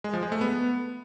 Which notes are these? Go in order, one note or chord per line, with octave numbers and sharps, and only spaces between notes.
G#3
F3
G#3
A3
B3